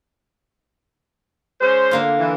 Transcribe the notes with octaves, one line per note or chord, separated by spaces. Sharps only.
G#3 C#4 C5
D3 A#3 F4
E3